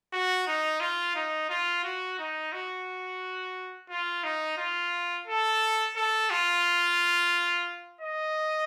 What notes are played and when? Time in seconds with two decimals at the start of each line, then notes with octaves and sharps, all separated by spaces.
0.13 F#4
0.47 D#4
0.81 F4
1.15 D#4
1.50 F4
1.84 F#4
2.19 D#4
2.53 F#4
3.90 F4
4.24 D#4
4.58 F4
5.27 A4
5.96 A4
6.31 F4
8.01 D#5